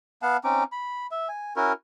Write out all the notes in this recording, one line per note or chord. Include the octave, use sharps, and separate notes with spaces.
B3 F5 F#5 A5
C4 C#4 D#4 D6
B5
E5
G#5
C#4 E4 F#4 A#4